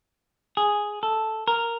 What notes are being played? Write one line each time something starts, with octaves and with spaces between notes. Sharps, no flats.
G#4
A4
A#4